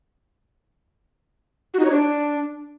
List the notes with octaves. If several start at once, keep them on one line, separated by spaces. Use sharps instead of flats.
F#4
D#4
C#5
D4